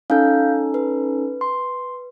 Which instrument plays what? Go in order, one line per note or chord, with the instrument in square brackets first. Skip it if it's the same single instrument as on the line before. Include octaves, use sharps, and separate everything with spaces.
[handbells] C#4 D#4 A4 [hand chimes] F5 G6
[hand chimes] B4
[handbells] C6